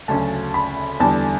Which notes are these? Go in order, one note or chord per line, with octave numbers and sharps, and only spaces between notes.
D2 C#3 F#3 C#4 A5
B5
E2 D3 G3 A5